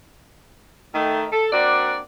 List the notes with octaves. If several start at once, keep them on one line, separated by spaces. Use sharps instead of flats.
D#3 A3
A4
A#3 C4 D4 F#4 D5